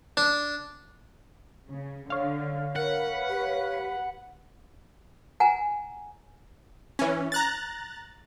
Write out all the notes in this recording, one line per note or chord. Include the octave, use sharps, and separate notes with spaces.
D4
C#3
D3 C#5 F5
A#4 B4 F#5
G4
F#5 G#5 A#5
E3 C#4
A#5 F#6 A6